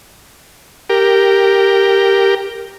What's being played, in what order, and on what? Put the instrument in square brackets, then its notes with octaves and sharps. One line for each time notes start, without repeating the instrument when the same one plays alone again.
[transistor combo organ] G4 A#4